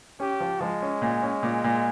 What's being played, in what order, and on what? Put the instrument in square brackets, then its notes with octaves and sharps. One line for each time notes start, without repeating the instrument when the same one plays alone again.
[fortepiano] C#4 [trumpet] G4
[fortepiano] F3
[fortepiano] F3 [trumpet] G#3
[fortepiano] C#4
A#2
C#4
A#2
A#2